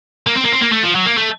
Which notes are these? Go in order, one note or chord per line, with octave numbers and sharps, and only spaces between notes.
A#3
C4
A#3
C4
A#3
A3
F3
F#3
A#3
A3